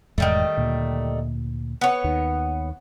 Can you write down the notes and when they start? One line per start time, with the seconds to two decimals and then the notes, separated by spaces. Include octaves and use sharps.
0.18 E1 E2 G#2 D#3 G3 A3
0.57 D2 A#2
1.81 B3 C#5
2.04 D#2 D#3